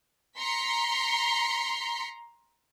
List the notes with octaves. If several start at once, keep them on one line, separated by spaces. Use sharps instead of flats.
A#5 C6 B6 C#7